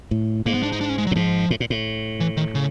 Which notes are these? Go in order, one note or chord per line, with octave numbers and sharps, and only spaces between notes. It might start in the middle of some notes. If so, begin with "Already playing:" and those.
A2
G#2 A#3
B3
D4
D#4
D4
C#4
G#3
F#3
A2
G#2 F3
A2
A#2
A2
E3
D#3
C#3